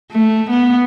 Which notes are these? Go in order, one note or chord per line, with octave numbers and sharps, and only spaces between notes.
A3
B3